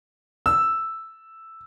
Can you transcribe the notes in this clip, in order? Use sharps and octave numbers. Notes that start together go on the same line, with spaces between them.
E6